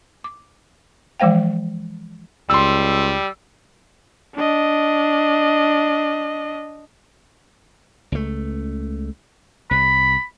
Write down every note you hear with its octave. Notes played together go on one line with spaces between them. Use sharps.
D6
E3 F3 G#3 C5 F5 G5
C#2 G3 C6 E6
D4 D#5
C#2 A3
C2 B5